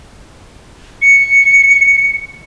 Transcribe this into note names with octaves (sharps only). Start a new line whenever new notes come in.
C#7